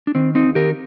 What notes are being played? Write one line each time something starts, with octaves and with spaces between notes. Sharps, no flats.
D4
D#3 C4
D#2 C4 D#4
D#3 G4 A#4